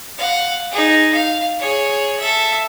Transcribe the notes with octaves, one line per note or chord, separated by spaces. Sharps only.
F5 F#5
D#4 G#4
F5
G#4 C#5
A4 E5